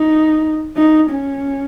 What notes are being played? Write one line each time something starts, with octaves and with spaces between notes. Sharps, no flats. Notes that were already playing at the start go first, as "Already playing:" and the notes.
Already playing: D#4
D#4
C#4